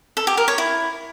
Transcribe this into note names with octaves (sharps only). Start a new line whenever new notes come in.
A4
G4
A#4
C#5
E4